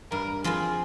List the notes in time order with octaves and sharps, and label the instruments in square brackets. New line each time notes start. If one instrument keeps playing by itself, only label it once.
[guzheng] G2 [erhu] A#4
[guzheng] F3 C4 F4 [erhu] G#4